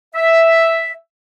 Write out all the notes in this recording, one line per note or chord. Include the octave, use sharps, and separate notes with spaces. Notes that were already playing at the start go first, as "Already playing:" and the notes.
E5